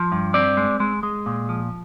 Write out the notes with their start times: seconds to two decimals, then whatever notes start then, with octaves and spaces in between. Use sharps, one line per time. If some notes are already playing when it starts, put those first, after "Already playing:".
Already playing: F3
0.12 G2
0.34 C4 D5
0.57 G#3
0.80 G#3
1.03 G#3
1.26 A#2
1.49 F3